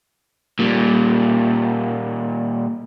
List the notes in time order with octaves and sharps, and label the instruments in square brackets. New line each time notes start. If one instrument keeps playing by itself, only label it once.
[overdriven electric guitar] A#2 G3